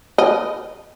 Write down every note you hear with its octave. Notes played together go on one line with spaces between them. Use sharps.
D#5